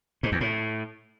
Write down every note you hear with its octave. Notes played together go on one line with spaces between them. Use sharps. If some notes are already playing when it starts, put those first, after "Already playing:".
G#2
E2
A2